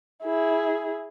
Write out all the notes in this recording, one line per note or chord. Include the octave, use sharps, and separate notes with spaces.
E4 G#4